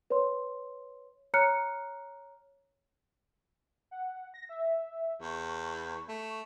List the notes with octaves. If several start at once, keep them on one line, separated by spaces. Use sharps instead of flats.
B4 C#5 C6
C#5 A#5 F6 F#6 C#7
F#5
A#6
E5
E2 C#6
A3